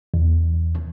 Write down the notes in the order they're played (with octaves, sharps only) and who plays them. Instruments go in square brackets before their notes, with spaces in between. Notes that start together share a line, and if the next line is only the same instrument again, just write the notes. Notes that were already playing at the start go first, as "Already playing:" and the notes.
[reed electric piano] E2